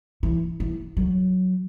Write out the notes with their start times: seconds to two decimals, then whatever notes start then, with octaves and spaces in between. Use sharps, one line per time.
0.23 E3
0.60 E3
0.97 F#3